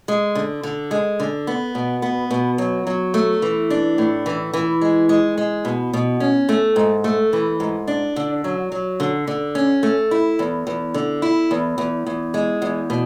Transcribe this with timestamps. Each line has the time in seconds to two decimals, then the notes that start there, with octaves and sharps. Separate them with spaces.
0.08 G#3
0.35 D3
0.63 D3
0.91 G#3
1.20 D3
1.47 B3
1.75 B2
2.02 B3
2.31 B2
2.58 F#3
2.87 F#3
3.14 A3
3.42 E3
3.70 D4
3.98 A2
4.26 E3
4.54 E3
4.81 G#3
5.09 G#3
5.38 G#3
5.65 B2
5.93 B2
6.20 C#4
6.49 A3
6.76 G#2
7.04 A3
7.33 E3
7.60 G#2
7.88 D4
8.16 D3
8.44 F#3
8.72 F#3
9.00 D3
9.27 D3
9.55 C#4
9.83 A3
10.11 E4
10.39 E2
10.67 E2
10.94 D3
11.22 E4
11.51 E2
11.78 E2
12.07 E2
12.34 G#3
12.62 E2
12.90 B2